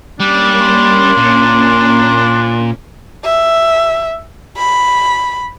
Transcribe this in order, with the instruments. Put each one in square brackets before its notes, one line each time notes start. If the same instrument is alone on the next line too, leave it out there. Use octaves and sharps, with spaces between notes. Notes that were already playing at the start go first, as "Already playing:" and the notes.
[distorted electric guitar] G3 [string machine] A#3 C#4 [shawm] D4
[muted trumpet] C6
[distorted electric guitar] A#2
[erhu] E5
B5